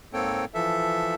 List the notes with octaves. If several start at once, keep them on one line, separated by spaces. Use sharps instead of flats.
G#2 A#3 C4 A4 C#5 G5
E3 F3 A4 E5